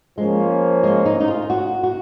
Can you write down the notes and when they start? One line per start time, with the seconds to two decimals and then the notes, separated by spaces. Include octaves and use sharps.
0.17 F3 G#3 A#3 C#4
0.84 G#3
1.05 D#4
1.20 D#4
1.28 F4
1.50 F#4
1.83 F#4